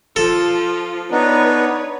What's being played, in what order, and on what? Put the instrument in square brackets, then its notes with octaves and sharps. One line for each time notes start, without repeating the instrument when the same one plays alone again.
[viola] F3 F4 [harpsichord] A4
[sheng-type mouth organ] B3 D4 D#4 [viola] B4 C#5